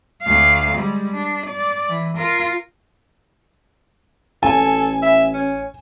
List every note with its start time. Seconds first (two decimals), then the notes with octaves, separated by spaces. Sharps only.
0.22 D2 F5
0.75 G3 G#3
1.13 D4
1.46 D5
1.88 E3
2.17 F4 A#4
4.43 A1 A4 G#5
5.02 E5
5.34 C#4